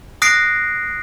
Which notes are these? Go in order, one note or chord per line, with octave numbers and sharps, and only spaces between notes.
D#6 F#6 A#6 C7 D7